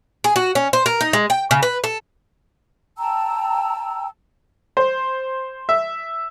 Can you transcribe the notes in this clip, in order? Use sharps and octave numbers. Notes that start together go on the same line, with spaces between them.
G#4
F#4
C#4
C5
A#4
D#4
G#3
G5
C#3
B4
A4
G5 A5 A#5 E6
C5
E5